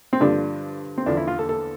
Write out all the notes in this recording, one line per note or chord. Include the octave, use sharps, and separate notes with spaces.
C4
G2 D3 F3 D4
C4
E2 D3 F3 D4
E4
F4
A4
A4